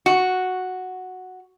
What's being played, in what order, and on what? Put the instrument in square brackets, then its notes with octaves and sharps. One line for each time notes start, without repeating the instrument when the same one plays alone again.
[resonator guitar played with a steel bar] F#4